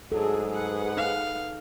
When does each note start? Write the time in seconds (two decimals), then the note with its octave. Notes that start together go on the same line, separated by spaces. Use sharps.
0.12 G#2 F#3 D4 G#4 A4
0.50 G#4 B4 F#5
0.97 D#4 F5